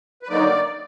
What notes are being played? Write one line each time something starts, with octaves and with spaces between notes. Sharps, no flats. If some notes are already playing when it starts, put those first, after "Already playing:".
B4
D3 F#3 A#3 D#4 D5